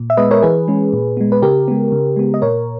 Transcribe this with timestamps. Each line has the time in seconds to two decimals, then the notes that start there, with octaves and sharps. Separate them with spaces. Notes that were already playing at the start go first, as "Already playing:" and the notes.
Already playing: A#2
0.10 E5
0.17 G#3 B3 B4 D#5
0.31 A#4 C#5
0.43 E3 G#4 B4
0.68 G#3 C#4
0.93 A#2
1.17 G#3 B3
1.32 B4
1.42 C#3 G4 A#4
1.68 G#3 B3
1.92 C#3
2.16 G#3 B3
2.34 D#5
2.42 A#2 A#4 C#5